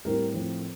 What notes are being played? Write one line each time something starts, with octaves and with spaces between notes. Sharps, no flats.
A2 G3 C4 E4 A#4
A2 F3 C4